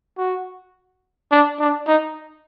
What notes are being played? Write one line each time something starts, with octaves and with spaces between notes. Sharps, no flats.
F#4
D4
D4
D#4